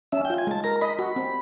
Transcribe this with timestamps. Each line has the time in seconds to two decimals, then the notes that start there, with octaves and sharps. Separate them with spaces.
0.12 C#4 E5
0.25 G5
0.30 F4
0.38 G#5
0.47 G#3 A5
0.64 A#4 A#5
0.81 D#5 B5
0.99 F#4 B5
1.16 C4